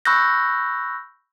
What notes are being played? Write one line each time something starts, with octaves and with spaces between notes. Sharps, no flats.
B5 C#6 E6 F#6 G6 A#6